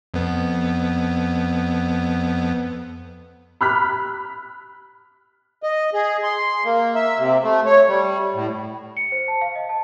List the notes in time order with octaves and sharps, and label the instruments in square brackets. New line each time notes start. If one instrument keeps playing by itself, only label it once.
[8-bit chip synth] F2 B3
[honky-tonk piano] B5 F6 F#6 B6
[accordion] D#5
G#4
C6
A#3
E5
C3
A3
C#5
G3
A2
[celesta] C#7
C5
A5
F5
D#5
A5